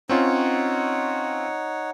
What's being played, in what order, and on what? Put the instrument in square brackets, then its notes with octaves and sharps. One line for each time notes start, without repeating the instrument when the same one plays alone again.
[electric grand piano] C4 C#4 F4 [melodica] D#4 C#5 F#5